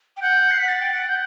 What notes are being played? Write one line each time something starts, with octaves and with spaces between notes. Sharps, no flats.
G5
F#5 G6
C7
B6
F#5 A6
G5
F#5
G6